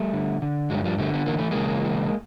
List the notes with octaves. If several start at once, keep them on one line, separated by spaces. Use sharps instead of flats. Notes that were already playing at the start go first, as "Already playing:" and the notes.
Already playing: G3 A3
D3
D3
G2 F#3 G#3
F3 G3
D3 G3 A3
B3
E3 A#3
A3
C#3 G#3 A#3
E3